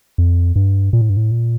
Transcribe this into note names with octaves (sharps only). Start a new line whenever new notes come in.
F2
G2
A#2
A2
G2
A2
A#2